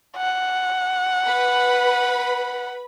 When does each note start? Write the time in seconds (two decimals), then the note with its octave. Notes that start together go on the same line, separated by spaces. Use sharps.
0.17 F#5
1.25 B4 B5